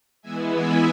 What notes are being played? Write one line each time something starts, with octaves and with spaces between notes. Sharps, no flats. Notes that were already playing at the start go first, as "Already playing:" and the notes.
E3 G#3 B3 E4 E5 G#5
E5 G#5